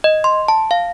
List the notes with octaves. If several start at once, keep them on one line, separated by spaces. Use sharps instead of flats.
D#5
C6
A5
F5